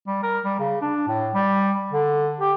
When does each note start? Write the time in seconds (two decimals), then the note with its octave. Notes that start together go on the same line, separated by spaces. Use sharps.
0.07 G3
0.23 A#4
0.44 G3
0.60 C#3
0.81 D4
1.08 A2
1.34 G3
1.92 D3
2.40 G4